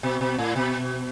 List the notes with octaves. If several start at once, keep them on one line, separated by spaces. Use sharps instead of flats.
B2
B2
A2
B2